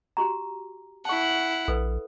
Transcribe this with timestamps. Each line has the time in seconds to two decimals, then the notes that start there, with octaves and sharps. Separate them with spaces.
0.17 F#4 G4 A#5
1.05 E4 F#5 A5 C#6
1.68 A#1 A4 B4